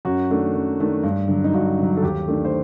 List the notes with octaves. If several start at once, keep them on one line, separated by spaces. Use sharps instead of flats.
F#2 F#4
D#3 A3 D4
F#2
D#3 A3 D4
G2
D3 F#3
D#4
G2 F#4
D3 F#3
A4
D#2 G4
D#3 A3 D4
C5